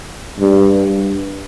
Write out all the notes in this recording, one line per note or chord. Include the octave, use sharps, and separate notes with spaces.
G2